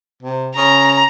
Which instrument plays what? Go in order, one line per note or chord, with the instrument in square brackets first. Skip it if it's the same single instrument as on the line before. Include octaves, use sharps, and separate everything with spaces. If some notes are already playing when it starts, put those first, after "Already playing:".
[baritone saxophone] C3
[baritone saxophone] C#3 [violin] A#5